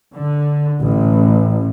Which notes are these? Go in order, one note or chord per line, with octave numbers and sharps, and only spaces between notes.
D3
A1